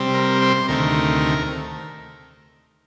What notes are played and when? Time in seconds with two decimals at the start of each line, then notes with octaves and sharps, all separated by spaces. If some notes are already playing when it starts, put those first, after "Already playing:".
Already playing: C3 G3 C4
0.14 A#4
0.42 C5
0.69 D2 C3 D#3 A3 A#4